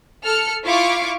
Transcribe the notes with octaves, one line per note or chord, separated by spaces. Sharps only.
A4 F6 C#7
E4 F4 F5 C#6 D6